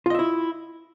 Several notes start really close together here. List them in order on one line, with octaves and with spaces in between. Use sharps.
F4 D#5 E5 E4